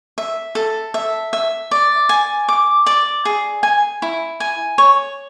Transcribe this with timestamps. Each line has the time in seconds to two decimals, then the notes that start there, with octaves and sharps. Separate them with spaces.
0.18 E5
0.55 A4
0.94 E5
1.33 E5
1.71 D5
2.09 G#5
2.48 D6
2.86 D5
3.25 G#4
3.63 G#5
4.02 E4
4.40 G#5
4.78 C#5